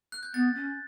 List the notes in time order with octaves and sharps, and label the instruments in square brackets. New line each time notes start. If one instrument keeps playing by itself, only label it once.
[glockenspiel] F#6
G6
[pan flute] B3 [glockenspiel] A6
[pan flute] C#4